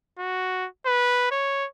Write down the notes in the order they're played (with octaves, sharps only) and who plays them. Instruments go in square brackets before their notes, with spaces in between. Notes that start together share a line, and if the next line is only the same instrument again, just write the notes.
[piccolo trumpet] F#4
B4
C#5